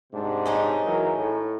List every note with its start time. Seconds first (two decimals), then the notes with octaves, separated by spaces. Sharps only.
0.12 G#2 C3 D4
0.46 G#3 C#4 D#4
0.83 E3 F#3 A#4
1.16 A2